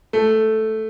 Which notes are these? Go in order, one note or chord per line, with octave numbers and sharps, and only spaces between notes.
A3